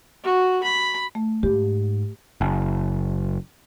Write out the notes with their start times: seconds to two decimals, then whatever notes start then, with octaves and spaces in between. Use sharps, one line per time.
0.23 F#4
0.63 B5
1.15 A3
1.43 G#2 G4
2.41 F#1